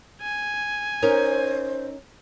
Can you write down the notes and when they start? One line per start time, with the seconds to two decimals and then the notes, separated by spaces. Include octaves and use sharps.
0.21 G#5
1.02 C#4 D#4 A#4 C5